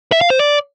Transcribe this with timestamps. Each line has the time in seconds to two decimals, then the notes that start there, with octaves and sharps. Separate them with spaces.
0.12 E5
0.21 F5
0.30 C5
0.39 D5